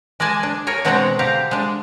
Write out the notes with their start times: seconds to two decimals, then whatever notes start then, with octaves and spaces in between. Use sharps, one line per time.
0.20 G#3 D5 D#5 G#5 A5
0.43 D4
0.67 G#4 A#4 C#5 G#5
0.85 B2 G#3 C4 D4 F#5 A#5
1.19 D3 G4 F5 A#5
1.51 G#3 D4